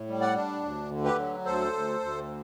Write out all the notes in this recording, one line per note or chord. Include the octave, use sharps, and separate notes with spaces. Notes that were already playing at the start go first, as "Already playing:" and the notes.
Already playing: A2
G3
D5 F#5
D4
D2
D3
G4 B4
F#3
D2 A4 C5
D2
D2